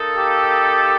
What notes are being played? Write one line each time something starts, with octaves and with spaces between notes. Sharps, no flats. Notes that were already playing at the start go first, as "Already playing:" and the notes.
Already playing: A#3 D#4 A4
G4